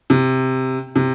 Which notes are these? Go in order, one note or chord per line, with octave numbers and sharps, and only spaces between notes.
C3
C3